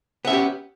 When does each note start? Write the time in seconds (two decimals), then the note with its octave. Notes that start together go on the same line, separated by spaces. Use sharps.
0.25 B3
0.27 E5
0.30 C#4
0.33 G4